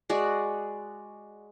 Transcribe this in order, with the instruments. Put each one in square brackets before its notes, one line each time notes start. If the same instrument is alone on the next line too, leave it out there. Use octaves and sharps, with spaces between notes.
[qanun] G#3 F#4 D5